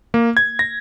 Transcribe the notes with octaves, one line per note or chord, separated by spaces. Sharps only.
A#3
G#6
A#6